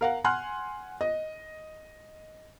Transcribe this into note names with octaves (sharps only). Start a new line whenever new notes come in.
A#4 F5 F#5
F#5 G#5 C6 F6 F#6
D#5